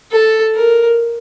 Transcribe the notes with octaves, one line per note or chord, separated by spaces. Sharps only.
A4
A#4